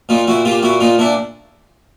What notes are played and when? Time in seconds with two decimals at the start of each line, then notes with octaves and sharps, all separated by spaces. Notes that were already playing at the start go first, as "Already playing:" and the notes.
0.09 A#2 D#4 F4
0.27 A#2 E4 F#4
0.45 A#2 F4 G4
0.63 A#2 E4 F#4
0.80 A#2 D#4 F4
0.99 A#2 D4 E4